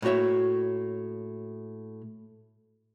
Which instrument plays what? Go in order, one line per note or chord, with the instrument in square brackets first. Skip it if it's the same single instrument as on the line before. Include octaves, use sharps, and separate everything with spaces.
[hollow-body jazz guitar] A2 A#3 F#4 C#5 E5